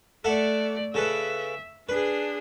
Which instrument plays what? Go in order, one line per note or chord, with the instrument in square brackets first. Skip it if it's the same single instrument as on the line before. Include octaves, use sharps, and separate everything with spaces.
[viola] A3 D5 [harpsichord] A4 E5 F#5
[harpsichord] C#3 A4 B4 [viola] E5
[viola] D4 G#4 [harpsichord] B4